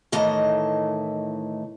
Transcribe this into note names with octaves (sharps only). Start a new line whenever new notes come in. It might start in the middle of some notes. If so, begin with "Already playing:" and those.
A2 D#3 E3 A3 D#5